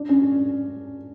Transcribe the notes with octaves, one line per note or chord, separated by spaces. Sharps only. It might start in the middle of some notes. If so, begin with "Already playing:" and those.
Already playing: D4
C#4